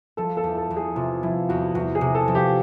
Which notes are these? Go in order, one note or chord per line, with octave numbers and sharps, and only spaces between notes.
F3 A4
A4
E2
A4
E2
G#4
C3 F4
F3 E4
E2 F#4
E2 F#4
G#4
C3
A4
F3
G4